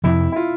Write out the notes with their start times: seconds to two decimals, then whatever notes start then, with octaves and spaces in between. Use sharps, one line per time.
0.04 F2 C3 F3 E4
0.32 E4
0.36 F4